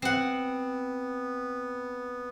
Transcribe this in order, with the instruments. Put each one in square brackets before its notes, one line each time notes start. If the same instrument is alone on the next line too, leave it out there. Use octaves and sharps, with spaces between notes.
[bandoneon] B3 [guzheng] C4 F#5